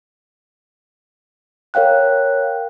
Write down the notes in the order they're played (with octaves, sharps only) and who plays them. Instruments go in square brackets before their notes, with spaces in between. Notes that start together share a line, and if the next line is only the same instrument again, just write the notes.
[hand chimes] A#4 C#5 F5 G5 F#6